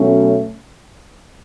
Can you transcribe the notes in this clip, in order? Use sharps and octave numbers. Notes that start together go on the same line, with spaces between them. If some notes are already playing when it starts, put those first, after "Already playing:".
Already playing: B2 F#3 A3 C#4